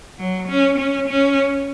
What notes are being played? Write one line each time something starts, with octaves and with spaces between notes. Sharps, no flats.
F#3
C#4
C#4
C#4